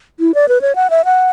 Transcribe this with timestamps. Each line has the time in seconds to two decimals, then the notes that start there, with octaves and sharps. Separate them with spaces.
0.20 E4
0.34 D5
0.49 B4
0.61 C#5
0.76 F#5
0.90 E5
1.05 F#5